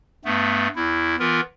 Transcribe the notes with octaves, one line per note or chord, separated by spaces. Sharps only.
G2 A3 B3
E2 E4
E3 B3 F4 A#4